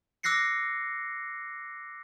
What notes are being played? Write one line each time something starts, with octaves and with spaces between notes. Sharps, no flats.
D6 E6 F#6 A#6 C7 C#7